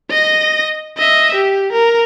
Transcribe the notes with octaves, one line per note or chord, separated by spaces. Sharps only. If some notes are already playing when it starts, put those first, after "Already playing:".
D#5 A#6
D#5 E5
G4
A#4